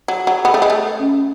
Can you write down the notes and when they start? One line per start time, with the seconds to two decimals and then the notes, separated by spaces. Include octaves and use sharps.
0.08 F#3
0.27 F#3
0.45 B3
0.54 A3
0.62 G#3
0.70 A3
1.00 C#4